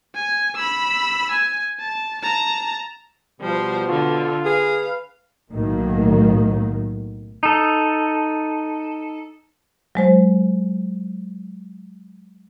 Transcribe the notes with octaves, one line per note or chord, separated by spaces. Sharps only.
G#5
B5 E6
G#5
A5
A5 A#5
B2 F3 G3 C5
D3 F4
G#4 B4 F5
B1 A2 D#3 F#3 A#3
D#4 A4
F#3 G#3 C5